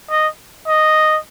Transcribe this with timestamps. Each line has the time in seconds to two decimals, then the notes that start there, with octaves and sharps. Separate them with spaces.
0.11 D#5
0.68 D#5